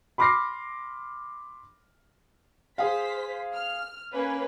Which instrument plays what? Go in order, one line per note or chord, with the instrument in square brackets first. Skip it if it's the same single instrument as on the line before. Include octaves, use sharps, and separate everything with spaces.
[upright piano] B5 C6 D6 F6 A#6 C7
[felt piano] G#4 F5 [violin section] C5 B6
[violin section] F6
A#3 C#4 B4